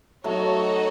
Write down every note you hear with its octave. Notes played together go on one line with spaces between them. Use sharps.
F#3 A3 D#4 F#4 C#5